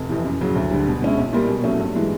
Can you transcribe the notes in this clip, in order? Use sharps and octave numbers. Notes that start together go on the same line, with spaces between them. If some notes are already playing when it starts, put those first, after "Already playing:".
Already playing: F1
F2 C3 E3
F#2
C#3 F#3
D2
D3 G3
B2
G#3 C#4 E4
B1
A#2 G3 A#3
B2
F#3 A3 C#4
G2
E3 G#3